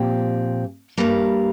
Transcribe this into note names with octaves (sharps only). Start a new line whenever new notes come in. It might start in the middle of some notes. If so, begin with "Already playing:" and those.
Already playing: A#2 F3 C4 G4
G2 G3 A#3